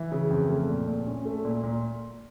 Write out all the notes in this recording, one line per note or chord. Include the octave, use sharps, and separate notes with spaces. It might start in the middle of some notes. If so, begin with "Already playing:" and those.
Already playing: E3
C#3
F2
A3
A#2
A#2
C#4
A3
A#2
A#2